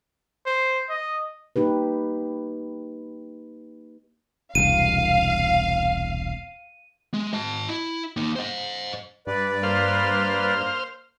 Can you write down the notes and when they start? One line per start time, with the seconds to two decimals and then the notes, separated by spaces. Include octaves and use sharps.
0.46 C5
0.89 D#5
1.56 A#3 D#4 G4 B4
4.55 E1 C2 F5 D#7
7.14 G#3
7.33 D#5 A5
7.69 E4
8.17 A#3 D#4
8.36 C5 D#5
9.27 G2 B4 D5
9.63 A#3 C5 F6